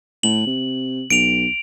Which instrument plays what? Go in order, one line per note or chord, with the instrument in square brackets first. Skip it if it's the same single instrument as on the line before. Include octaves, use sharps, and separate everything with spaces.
[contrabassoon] A2 [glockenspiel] F#7
[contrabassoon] C3
[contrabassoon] B1 [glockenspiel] D7 F7